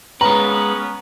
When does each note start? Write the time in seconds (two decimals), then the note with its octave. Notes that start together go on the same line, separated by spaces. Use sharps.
0.21 G#3 B3 C#4 B4 A#5